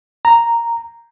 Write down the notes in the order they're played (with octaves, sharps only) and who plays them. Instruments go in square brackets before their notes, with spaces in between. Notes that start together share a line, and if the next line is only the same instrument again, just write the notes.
[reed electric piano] A#5